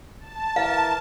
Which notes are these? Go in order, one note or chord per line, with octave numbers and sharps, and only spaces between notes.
A5
E3 A#4 F5